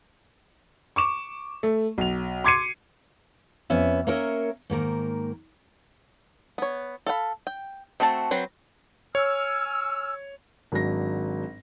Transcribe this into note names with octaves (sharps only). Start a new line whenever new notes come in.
C#6 D6 E7
A3
B1 F7
C6 D6 G#6 C7 C#7 D#7
F2 B3 C#4 E5
A#3 C#4 A#4 C#5 E5
G#2 D#3 A#3 A#4
B3 C#5
A4 F5 F#5 B5
G5
A3 C4 F#4 A#4 A5
F#3 C4 B4 C5
C#5 G#5 E6 F6
G#1 F#3 D4 A#6